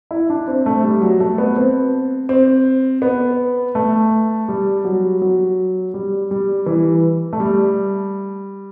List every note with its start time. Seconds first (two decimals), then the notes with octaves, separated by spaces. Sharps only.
0.11 E4
0.30 D4
0.48 C4
0.66 A3
0.84 G3
1.02 F#3
1.20 A3
1.38 B3
1.56 C4
2.29 C4
3.02 B3
3.75 A3
4.48 G3
4.85 F#3
5.22 F#3
5.94 G3
6.31 G3
6.66 E3
7.33 A3
7.40 G3